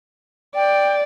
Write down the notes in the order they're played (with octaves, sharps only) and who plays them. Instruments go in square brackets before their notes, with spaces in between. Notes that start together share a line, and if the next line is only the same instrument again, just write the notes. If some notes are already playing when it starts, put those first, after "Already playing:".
[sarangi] D5 [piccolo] G5